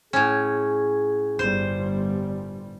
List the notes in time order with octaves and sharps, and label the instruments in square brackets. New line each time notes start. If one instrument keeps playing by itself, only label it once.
[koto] A2 C#4 [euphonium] G#4
[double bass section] G1 G3 [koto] C5